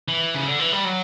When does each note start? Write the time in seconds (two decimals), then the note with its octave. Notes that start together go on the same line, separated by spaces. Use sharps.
0.08 E3
0.35 C#3
0.47 D3
0.59 E3
0.72 G3
0.85 F#3